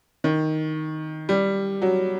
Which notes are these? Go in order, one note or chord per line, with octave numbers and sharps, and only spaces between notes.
D#3
G3
F#3